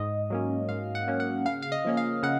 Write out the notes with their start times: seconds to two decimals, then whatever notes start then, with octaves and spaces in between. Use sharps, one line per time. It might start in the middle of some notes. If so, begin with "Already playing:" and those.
Already playing: G#2 D#5
0.30 F#3 A#3 C#4
0.69 G#2 F5
0.95 F#5
1.08 F#3 A#3 C#4
1.20 F#5
1.46 C#3 F5
1.62 F5
1.72 D#5
1.85 F3 A#3 C#4
1.97 F5
2.23 C#3 F#5